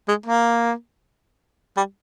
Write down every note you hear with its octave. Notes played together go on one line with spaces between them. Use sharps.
G#3
A#3
G3